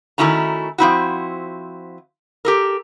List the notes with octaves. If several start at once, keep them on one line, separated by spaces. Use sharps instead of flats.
D#3 A3 C#4 E4 F#4 A#5
F3 C4 E4 F#4
G4 A4 A#4